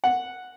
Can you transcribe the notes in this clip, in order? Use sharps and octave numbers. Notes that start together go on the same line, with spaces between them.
F#5